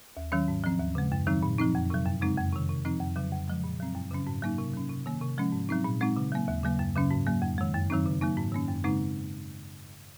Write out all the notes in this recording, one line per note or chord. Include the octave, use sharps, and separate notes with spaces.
D#2
D#3 F#3 C#4
G#2
F3 C4
D#2
C#3 G#3
F#2
D#3 F#3 C4 D#4
A#2
F3 C4 D#4
F2
C3 F#3
F#2
C#3 G#3 C4 D#4
F2
C3 D#3
C3
F3 C4 D#4
F2
C#3 F#3
F2
C#3 F3 G#3
A#2
F#3 C4
F#2
C#3 F#3 C#4
G#2
F#3 A#3 D#4
C3
F#3 C#4
C3
D#3 A#3
C3
F3 G#3 C#4
G#2
F#3 C4 D#4
A#2
G#3 C4 D#4
C#3
F#3 A#3
D#2
C#3 F#3 A#3
F#2
C#3 F#3 C#4
G#2
F#3 A#3
F2
D#3 G#3
F#2
D#3 F#3 C4 D#4
C#3
F#3 A#3 D#4
G#2
D#3 A#3 C#4
F#2
C#3 G#3 C4 D#4